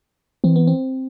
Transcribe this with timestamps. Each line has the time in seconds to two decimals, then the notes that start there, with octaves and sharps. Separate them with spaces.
0.44 E3 C4
0.56 B3
0.67 C4